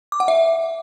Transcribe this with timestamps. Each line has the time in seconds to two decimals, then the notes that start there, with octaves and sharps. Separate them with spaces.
0.12 D6
0.20 F#5
0.28 E5